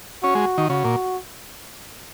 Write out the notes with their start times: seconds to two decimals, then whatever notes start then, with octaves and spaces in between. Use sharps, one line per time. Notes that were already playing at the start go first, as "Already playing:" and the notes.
0.23 C#4 F#4
0.35 G#3
0.58 D#3
0.69 C#3 F#4
0.85 A#2